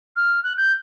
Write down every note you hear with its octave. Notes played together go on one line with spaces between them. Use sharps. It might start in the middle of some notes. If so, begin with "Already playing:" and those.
F6
F#6
G6